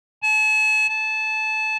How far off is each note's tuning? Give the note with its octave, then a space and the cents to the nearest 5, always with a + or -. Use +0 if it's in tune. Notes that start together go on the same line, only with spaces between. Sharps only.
A5 -40
A5 -20